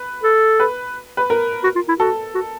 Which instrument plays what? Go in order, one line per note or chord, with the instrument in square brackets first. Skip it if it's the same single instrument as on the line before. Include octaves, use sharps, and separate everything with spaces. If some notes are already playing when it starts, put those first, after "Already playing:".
Already playing: [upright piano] B4
[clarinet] A4
[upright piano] B4
B4
A#4
[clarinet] F#4
F4
E4
[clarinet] F#4 [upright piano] A4
[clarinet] F#4